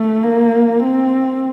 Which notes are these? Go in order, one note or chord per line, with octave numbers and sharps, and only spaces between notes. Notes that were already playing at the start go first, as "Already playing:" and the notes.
Already playing: A3
A#3
C4